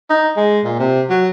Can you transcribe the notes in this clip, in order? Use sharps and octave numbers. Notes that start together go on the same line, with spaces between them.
D#4
G#3
A#2
C3
F#3